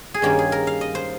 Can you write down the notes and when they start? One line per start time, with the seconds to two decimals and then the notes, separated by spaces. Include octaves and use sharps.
0.14 G#4
0.22 G2 D#3 A#3 C#4 G4
0.39 G#4
0.52 A#4
0.67 F5
0.81 D#5
0.95 C5